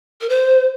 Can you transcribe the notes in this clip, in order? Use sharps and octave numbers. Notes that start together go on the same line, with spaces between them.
A#4
C5